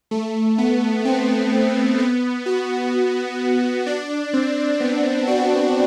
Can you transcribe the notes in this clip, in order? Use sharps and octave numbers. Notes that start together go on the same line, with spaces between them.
A3
B3
C4
B3
F#4
D4
C4
B3
F#4